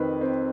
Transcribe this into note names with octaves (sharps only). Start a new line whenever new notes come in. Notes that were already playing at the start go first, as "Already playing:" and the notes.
Already playing: F2 D#3 C4 B4
C4